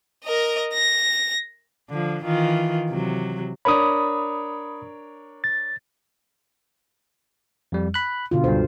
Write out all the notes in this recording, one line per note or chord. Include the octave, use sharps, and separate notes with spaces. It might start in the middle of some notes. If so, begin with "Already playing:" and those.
A#4 D#5
A#6
D3 F3
D#3 E3 F4
C3 F#3
D4 A#4 C#5 B5 D#6
A6
F2 G3
B5 F#6
B2 D3 F4
C#2 G2 C5